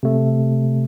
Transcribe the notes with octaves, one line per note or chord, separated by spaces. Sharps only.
C3 A3